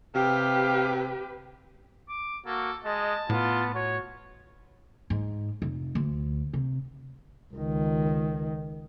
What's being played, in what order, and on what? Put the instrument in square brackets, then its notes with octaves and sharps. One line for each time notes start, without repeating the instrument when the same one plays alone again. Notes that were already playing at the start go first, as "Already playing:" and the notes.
[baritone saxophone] C3 [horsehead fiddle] G4 B4 [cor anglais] F5
[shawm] D6
[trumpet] A#3 [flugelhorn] F#4 [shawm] A4
[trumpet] G#3 [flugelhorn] D#5 [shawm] A5
[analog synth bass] A2 [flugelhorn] B3 [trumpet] F4
[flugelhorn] F#4 [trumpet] C#5
[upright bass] G#2
F1
D2
C3
[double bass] C#2 D#3